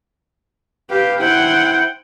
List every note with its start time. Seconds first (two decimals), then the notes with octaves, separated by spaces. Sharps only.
0.90 G4 B4 F5 G5
1.21 E4 C5 F#5 G5